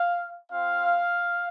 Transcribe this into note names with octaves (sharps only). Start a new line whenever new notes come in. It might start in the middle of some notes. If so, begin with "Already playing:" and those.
Already playing: F5
C4 F4 F5